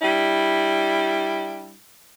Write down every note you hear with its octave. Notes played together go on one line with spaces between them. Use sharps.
G3 D4 E4